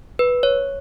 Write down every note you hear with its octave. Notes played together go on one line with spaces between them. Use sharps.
B4
C#5